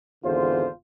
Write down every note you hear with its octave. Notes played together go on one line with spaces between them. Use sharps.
G#1 E2 D3 F4 C5